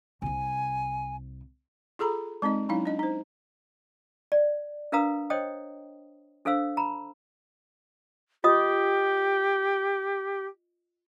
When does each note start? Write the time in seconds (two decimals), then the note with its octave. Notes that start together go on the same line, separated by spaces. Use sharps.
0.22 C2 C3 G#5
1.99 F4 G#4 A4 A#5 B5
2.42 G#3 C4 D#4 D#5
2.69 F#3 C#4 D#4 E4 F5
2.85 D4 D#5
2.99 D#4 C5
4.32 D5
4.92 D4 A#4 B4 F5 A#5 D#6
5.30 C5 C#5 D#5 G5 D#6
6.45 D4 A4 C5 F5 E6
6.77 A#5 B5
8.44 F4 G4 D#5 D#6